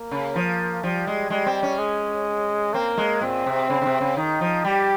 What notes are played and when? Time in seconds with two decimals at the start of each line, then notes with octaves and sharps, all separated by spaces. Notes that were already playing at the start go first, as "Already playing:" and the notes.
Already playing: A#3
0.11 C#3
0.36 F3
0.83 F3 G3
1.07 G#3
1.30 G3 G#3
1.46 C4
1.63 C#4
1.78 G#3
2.73 A#3 C4
2.98 G#3
3.21 A#2 C4
3.46 C3
3.70 C#3
3.82 C#3
3.86 C3
4.01 C#3
4.17 D#3 D#4
4.41 F3
4.65 G3 G4